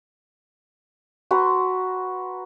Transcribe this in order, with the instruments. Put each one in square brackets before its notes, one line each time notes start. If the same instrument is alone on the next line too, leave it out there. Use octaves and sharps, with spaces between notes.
[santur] F#4 B4 A#5 C6